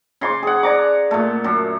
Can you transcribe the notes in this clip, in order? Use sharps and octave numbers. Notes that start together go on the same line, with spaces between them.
C#3 C6 D6
G#4 F#5
D5 A#5 D6
A#2 A3
F#2